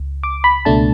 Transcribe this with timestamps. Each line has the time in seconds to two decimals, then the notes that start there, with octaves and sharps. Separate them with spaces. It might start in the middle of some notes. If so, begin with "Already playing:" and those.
Already playing: C#2
0.23 D6
0.44 B5
0.65 C#2 B2 A3 D4 A5